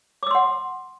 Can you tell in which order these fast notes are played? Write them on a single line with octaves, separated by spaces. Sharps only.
D6 E6 C6 F#5